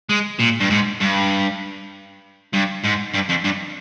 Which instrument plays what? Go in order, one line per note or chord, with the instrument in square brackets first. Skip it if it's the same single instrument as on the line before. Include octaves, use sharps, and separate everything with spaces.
[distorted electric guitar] G#3
A#2
G2
G#2
G2
G2
G#2
G2
F2
G2